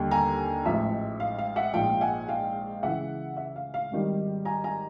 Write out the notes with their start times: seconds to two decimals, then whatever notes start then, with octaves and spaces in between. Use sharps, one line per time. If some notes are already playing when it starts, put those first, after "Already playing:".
Already playing: D#2 D3 G3
0.11 G#5 A#5
0.65 A1 G#2 F3 E5
1.20 F5
1.39 F5
1.56 E5 F#5
1.74 A#1 G#2 F3 F5 G5
2.01 F#5 G#5
2.29 F5 G5
2.83 C#2 C#3 E3 E5 F#5
3.37 E5
3.56 F5
3.74 F5
3.91 G#1 G#2 D#3 G3
4.45 G#5 A#5
4.64 G#5 A#5